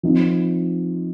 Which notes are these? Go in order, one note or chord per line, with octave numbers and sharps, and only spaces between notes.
F3 C4 D#4